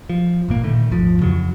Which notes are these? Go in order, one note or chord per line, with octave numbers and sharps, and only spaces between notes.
F3
G1 A#2 A#3
A#2 D3 D#3 A3
G#1 D#2 F3
F2 C#3 E3 F#3